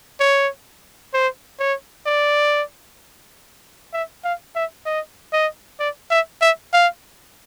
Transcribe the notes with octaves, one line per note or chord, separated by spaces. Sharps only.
C#5
C5
C#5
D5
E5
F5
E5
D#5
D#5
D5
E5
E5
F5